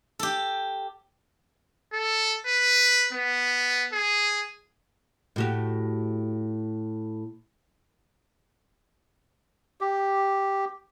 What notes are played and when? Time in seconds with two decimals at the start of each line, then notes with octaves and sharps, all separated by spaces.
0.19 G4 A4
1.93 A4
2.46 B4
3.13 B3
3.93 G#4
5.36 A2 F#4 G4
9.81 G4